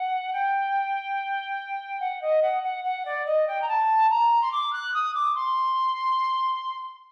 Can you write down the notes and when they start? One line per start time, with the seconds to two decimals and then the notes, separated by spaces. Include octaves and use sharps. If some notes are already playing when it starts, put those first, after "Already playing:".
Already playing: F#5
0.33 G5
2.00 F#5
2.21 D#5
2.42 F#5
2.63 F#5
2.84 F#5
3.05 D5
3.26 D#5
3.47 G5
3.61 A#5
3.68 A5
4.10 A#5
4.42 C6
4.52 D6
4.73 F#6
4.94 D#6
5.14 D6
5.35 C6